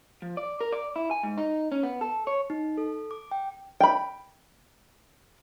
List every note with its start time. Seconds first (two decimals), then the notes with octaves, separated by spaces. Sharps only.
0.22 F3
0.37 D5
0.61 A#4
0.72 D5
0.96 E4
1.11 G#5
1.23 G#2
1.38 D#4
1.72 C#4
1.83 B3
2.01 A4
2.27 C#5
2.50 D#4
2.78 A4
3.11 D6
3.31 G5
3.80 G5 B5